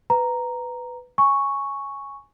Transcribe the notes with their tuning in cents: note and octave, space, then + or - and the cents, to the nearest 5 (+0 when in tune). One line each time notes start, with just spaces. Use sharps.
B4 +10 A#5 +0
G#5 +0 C#6 +0